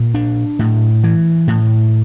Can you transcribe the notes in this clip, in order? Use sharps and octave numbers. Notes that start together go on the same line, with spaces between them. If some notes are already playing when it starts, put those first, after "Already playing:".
Already playing: A#2
D4
A2
E3
A2